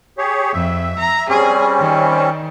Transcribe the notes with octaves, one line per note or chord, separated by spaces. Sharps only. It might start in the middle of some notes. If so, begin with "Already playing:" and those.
G4 G#4 C#5
F2 E5
A#5
G3 C4 C#4 G#4
D#3